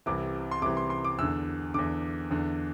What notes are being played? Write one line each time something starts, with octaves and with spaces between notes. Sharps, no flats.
C2 C3 E3 D6
C6
C2 C3 E3 D6
C6
C6
D6
E2 D3 E6
E2 D3 D6
E2 D3